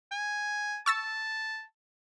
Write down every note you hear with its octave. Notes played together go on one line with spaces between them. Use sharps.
G#5
A5 C#6 E6 A6